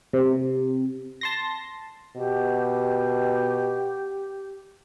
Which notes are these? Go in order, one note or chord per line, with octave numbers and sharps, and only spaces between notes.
C3
A5 C6 A#6
B2 G4